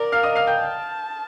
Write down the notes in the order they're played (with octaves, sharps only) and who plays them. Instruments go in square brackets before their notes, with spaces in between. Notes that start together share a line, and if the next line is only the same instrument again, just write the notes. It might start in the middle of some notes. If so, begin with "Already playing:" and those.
Already playing: [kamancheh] A#4 [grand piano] D5 D6
[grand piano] F5 F6
D#5 D#6
F5 F6
G5 G6
[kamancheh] A5